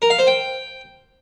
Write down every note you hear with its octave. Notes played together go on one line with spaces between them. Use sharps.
A#4
F5
C5
G5